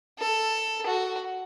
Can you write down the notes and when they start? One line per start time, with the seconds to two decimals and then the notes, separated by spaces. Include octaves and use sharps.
0.19 A4
0.86 F#4